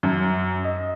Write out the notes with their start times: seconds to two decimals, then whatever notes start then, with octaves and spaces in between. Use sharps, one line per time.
0.03 F#2
0.64 D#5